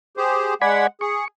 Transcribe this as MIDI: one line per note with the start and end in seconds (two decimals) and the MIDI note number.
0.17 0.54 67
0.17 0.54 68
0.17 0.54 72
0.62 0.86 56
0.62 0.87 74
0.62 0.86 78
0.62 0.87 80
0.62 0.87 83
1.01 1.25 68
1.01 1.28 85